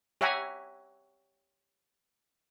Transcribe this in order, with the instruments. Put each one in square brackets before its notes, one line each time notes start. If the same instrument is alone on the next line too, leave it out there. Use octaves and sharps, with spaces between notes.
[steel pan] G4 C#5 E5 F#5 G#5 A#5